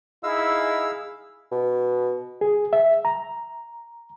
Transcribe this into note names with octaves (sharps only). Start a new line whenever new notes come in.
D#4 E4 G#4 F5 E6
B2
G#4
E5
A#5